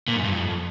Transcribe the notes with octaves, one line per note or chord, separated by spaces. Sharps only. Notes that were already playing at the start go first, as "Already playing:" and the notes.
A#2
F#2
G2
F2